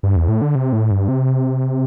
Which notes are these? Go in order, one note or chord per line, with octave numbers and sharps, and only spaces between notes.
G2
E2
A2
D3
C3
A2
G2
C3